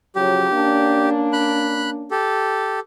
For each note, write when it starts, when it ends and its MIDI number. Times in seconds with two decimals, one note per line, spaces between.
0.16 0.51 49
0.16 0.51 53
0.16 0.51 54
0.16 1.09 67
0.52 2.12 58
0.52 2.12 61
0.52 2.12 62
1.33 1.90 83
1.33 1.90 90
2.11 2.80 67
2.11 2.80 69